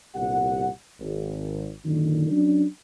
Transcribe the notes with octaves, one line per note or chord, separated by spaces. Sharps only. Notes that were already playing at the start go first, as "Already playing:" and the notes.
G1 C2 A#2 G4 F#5
G#1
F#2 A#2 D3 D#3
F#3 C#4 D4